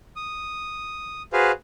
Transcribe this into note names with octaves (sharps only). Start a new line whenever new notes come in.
D#6
F#4 G#4 B4 C5 F5